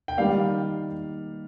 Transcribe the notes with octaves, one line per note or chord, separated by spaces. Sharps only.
G5
D#3 G3 A#3 D5 F5